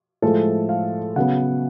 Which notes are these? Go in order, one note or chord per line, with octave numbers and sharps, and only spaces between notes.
A2 F3 G#3 A4
F5
C#3 F#3 B3 F#5